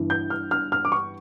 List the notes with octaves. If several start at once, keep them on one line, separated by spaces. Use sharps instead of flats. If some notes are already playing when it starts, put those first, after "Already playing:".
Already playing: G1 G2 E3
G6
F6
F6
F6
D6
C#6